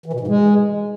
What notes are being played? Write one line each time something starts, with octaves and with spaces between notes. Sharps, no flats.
E3
B2
G#2
G#3